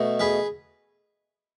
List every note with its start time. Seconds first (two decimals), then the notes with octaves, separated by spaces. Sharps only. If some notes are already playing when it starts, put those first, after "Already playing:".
Already playing: B2 A3
0.20 G#4 B4